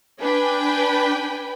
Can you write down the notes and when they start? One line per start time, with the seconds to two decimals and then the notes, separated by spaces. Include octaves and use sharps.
0.20 D4 B4 G5 G#5 B5